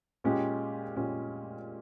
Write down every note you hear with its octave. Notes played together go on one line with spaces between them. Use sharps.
A#2 G#3 C#4 G4
A#2 G#3 C#4 G4